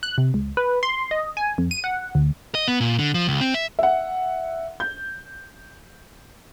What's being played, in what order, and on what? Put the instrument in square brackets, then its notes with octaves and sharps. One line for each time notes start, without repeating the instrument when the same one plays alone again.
[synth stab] F#6
C3
C#2
B4
C6
D#5
G#5
F2
D#7
F#5
D2
[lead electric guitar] D#5
B3
A#2
D3
F3
C#2
C4
E5
[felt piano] E5 F#5
G6